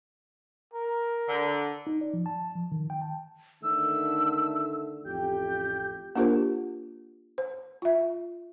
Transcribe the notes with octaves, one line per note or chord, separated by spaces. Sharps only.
A#4
D3
D#4
D5
F3
A5
F3
D#3
G5
A5
D3 D#3 A3 E6
A1 F2 G4 G6
A#3 D4 F4 G4 A#4 C5
C5
F4 E5